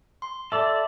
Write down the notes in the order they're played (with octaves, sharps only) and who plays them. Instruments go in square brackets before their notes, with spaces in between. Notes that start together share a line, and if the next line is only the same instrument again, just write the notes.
[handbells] C6
[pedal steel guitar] A4 D5 [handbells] E5